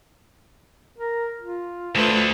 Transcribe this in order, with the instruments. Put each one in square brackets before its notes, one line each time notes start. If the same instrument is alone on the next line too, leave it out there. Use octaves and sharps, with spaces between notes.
[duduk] A#4
F4
[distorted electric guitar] D2 D3 [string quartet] A3 B4 C5